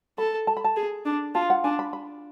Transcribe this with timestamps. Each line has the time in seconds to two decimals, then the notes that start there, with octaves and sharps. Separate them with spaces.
0.18 A4 B5
0.47 A5
0.57 B5
0.64 A5
0.76 G#4
1.05 D4
1.35 F4 A5
1.50 F#5
1.64 D4 G#5
1.79 B5
1.93 B5